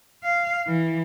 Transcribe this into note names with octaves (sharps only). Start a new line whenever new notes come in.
F5
E3